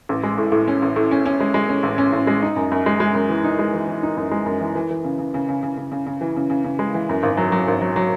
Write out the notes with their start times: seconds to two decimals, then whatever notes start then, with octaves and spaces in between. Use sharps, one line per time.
0.09 A1
0.23 G#3
0.38 A2
0.52 A2
0.68 C#4
0.82 A1
0.96 A2
1.11 C#4
1.26 C#4
1.40 G#3
1.54 G#3
1.69 C#4
1.83 A1
1.98 C#4
2.13 A1
2.27 G#3
2.42 D#4
2.56 F#2
2.72 F#2
2.86 G#3
3.00 G#3
3.15 F#2
3.29 E3
3.44 D#4
3.59 G#3
3.74 E3
3.87 E3
4.03 D#4
4.17 F#2
4.31 G#3
4.46 F#2
4.61 E3
4.75 E3
4.91 E3
5.04 C#3
5.19 C#3
5.34 C#3
5.49 C#3
5.63 C#3
5.77 C#3
5.92 C#3
6.07 C#3
6.21 E3
6.36 C#3
6.50 C#3
6.64 C#3
6.79 G#3
6.94 E3
7.09 F#2
7.23 G#1
7.37 F#3
7.52 F#3
7.68 G#1
7.82 F#3
7.96 F#3